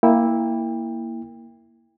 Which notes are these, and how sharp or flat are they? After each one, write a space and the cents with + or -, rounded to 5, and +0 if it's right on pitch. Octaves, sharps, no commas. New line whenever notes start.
A#3 +0 E4 -5 G5 +30